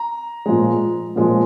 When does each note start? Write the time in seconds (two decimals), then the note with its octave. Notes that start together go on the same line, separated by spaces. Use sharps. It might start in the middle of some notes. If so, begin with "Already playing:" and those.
Already playing: A#5
0.46 A#2 F3 G#3
1.16 A#2 F3 G#3